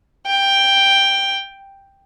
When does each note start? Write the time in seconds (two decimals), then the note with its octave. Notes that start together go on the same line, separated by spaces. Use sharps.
0.27 G5